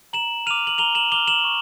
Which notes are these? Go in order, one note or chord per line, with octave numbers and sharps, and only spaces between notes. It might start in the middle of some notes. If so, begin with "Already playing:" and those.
A#5 E7 F#7
D6 F6 D#7 F7
F#7
A#5 F7 G7
E7 F#7
D6 F6 F7 G7
E7 F#7
C#6